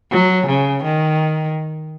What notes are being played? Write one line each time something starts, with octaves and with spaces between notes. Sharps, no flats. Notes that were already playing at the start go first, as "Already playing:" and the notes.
F#3
C#3
D#3